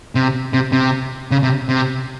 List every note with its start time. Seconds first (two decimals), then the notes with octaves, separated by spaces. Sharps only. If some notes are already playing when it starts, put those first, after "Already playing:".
0.15 C3
0.53 C3
0.72 C3
1.31 C#3
1.43 C3
1.69 C3